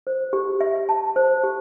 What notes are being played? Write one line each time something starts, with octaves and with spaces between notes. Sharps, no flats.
C5
G4
E5
A5
C5
G4